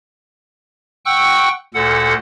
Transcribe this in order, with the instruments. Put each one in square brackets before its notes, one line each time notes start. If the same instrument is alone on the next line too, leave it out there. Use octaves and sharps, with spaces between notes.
[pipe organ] F#5 G5 C#6 E6 F#6
D2 A#2 A4 F#5